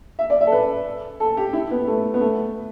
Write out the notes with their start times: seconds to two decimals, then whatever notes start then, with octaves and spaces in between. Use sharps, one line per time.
0.19 E5
0.30 D5
0.41 E5
0.47 A4
0.52 B4
1.20 A4
1.37 G4
1.53 E4
1.71 B3
1.87 A3
2.14 B3
2.21 A3